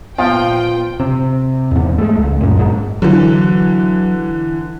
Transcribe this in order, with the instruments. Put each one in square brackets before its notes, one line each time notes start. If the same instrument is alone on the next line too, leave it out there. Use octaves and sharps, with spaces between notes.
[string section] A#2 G5 [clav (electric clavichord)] F3 [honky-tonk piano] B3 F5 [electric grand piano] F4
[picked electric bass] C3
E2 G#2
G#3 A3
C#2
F#2 A#2
G1 G#2
[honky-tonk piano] D3 E3 [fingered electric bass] F#3